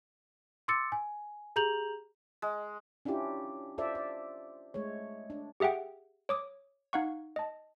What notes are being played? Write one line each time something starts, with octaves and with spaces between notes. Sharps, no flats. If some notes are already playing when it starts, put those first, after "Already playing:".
C6 D6 E6 A6 C#7
G#5
G4 G#4 A#5 G6 F7 F#7
G#3
C#4 D4 E4 F4 G4
F4 A4 C5 D5 E5
D5
G#3 A3 C#5
D4
G4 G#4 E5 F#5 G5
C#5 D6 D#6
D#4 F5 F#5 C#6
D#5 A5